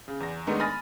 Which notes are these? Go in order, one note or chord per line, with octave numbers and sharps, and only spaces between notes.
C#3
E2 A#6
D#3 G#3 A3 B3 D4 D#4
G#5 B5 D#6 F6 A6 A#6